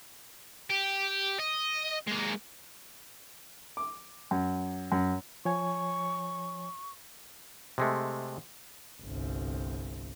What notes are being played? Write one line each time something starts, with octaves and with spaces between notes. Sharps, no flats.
G4
D#5
G#3 A#3
D6
F#2
F#2
F3 C#5 G#5 C#6
C3 G#3 A3
G1 C2